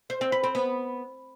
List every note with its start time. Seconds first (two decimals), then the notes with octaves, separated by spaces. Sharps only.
0.10 C5
0.21 C4
0.32 B4
0.44 C4
0.55 B3